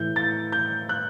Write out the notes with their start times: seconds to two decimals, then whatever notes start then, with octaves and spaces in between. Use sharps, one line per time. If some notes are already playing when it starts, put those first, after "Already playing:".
Already playing: A2 E3 G6
0.16 A6
0.52 G6
0.89 F#6